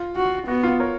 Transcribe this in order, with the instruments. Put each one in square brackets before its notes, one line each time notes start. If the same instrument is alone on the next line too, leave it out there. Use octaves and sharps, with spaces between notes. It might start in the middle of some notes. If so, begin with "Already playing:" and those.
Already playing: [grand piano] F4
[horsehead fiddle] F#4
[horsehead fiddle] B3 [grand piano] F#4
[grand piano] F4
A#4 C#5